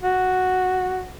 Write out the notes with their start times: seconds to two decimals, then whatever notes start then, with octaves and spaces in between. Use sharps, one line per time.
0.03 F#4